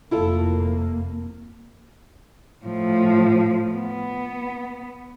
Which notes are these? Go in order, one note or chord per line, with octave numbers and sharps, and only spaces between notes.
F1 F2 A#3 E4 F4 A4
A2 F3
B3